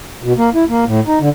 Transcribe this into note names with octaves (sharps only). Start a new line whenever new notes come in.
B2
A#3
E4
A#3
A2
D#4
D3